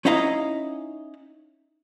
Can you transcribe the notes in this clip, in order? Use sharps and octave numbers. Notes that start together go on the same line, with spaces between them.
C#4 D#4 E4 D#5 F5 A#5